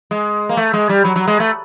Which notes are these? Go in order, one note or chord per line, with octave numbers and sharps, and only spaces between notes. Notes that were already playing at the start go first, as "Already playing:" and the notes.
G#3
A#3
A3
G#3
G3
F#3
F#3
G#3
A3